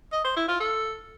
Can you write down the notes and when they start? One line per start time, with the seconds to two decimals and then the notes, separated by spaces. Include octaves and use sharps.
0.13 D#5
0.25 C5
0.37 E4
0.48 F4
0.60 A4